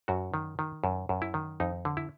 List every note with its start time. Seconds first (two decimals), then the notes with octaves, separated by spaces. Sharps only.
0.08 F#2 F#4
0.34 D#3
0.59 D#3
0.84 F#2
1.09 F#2
1.22 E4
1.34 D#3
1.60 F2 D#4
1.85 D3
1.97 E4